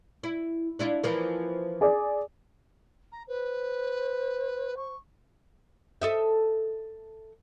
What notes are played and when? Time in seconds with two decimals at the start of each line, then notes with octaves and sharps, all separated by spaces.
0.23 E4
0.79 D4 E4 F4
1.03 E3 F3 A#3
1.81 G#4 D5
3.12 A#5
3.28 B4 C5
4.76 C#6
6.02 A4 D#5 E5